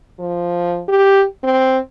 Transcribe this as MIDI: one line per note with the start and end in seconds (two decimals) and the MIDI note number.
0.19 0.82 53
0.88 1.24 67
1.43 1.78 60